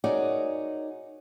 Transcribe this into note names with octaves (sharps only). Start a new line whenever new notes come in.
D#4 F#4 G#4 A#4 C#5 D5